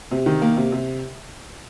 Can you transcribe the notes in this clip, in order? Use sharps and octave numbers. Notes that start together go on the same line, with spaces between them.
C3
D#3
A#3
C3
C3